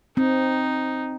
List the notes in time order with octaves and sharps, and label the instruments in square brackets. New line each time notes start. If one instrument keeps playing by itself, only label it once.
[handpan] C4 [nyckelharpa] D#4